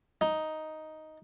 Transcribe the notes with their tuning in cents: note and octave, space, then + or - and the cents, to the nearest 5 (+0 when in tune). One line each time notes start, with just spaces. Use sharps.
D#4 +5